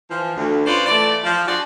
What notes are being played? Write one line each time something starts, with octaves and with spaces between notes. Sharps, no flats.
E3 F3
D2
C#4 F4 B4 C5 D5
E3 A3 D5
F3
D4 F4 F#4 G#4 D5